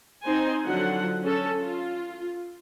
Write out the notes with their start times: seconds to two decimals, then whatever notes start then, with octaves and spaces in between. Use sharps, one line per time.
0.23 C4 D#4 C5 G#5
0.66 D3 F3 F#3 F#5
1.23 C#4 A4
1.59 F4